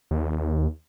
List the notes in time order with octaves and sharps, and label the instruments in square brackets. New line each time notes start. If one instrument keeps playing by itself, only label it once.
[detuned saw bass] D#2